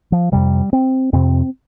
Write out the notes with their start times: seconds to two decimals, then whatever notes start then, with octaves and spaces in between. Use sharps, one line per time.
0.12 F3
0.32 F2 C3 G3
0.73 C4
1.13 F2 C3 C4